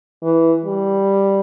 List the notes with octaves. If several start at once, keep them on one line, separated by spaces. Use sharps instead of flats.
E3
G3